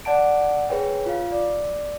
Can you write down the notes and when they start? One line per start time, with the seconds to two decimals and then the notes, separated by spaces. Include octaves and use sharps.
0.05 D5 F#5 A5 D7
0.69 G#4 B4 C#5 G5
1.06 F4 F5
1.32 D5